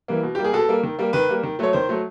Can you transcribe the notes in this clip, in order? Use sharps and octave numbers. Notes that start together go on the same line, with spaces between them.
E3 G3 A#3
B2
G3 A#3 G4
G#4
B2 A4
G3 A#3
D#3
G3 A#3
D#3 B4
G3 A#3
D#3
F#3 A3 C#5
D#3 C5
F#3 A3